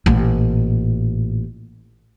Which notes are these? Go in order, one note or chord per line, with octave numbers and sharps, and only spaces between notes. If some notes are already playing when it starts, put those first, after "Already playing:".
A1 A#2